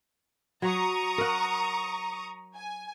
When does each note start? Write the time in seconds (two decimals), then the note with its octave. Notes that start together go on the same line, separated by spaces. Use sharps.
0.62 F#3 A#5 C#6 D#6
1.18 A#4 F#5
2.55 G#5